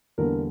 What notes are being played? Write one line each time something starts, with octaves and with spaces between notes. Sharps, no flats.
E2 D3 G3 A#3 A#4